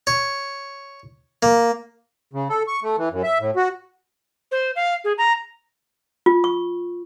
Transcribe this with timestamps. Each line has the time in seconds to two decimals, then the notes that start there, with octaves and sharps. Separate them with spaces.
0.07 C#5
1.43 A#3
2.33 C#3
2.49 A4
2.68 C#6
2.83 A3
2.98 E3
3.12 F#2
3.24 E5
3.40 A2
3.56 F#4
4.52 C5
4.76 F5
5.04 G#4
5.18 A#5
6.26 F4
6.44 C#6